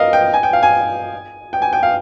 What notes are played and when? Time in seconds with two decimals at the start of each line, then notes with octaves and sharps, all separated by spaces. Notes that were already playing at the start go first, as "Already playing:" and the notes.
Already playing: A#4 D#5 F5
0.13 G5
0.33 G#5
0.43 G5
0.53 F5
0.63 G#5
1.53 G5
1.62 G#5
1.73 G5
1.83 F5